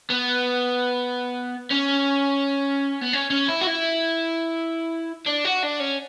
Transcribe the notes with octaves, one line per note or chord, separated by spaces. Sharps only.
B3
C#4
B3
C#4
C#4
E4
F#4
E4
D4
F#4
D4
C#4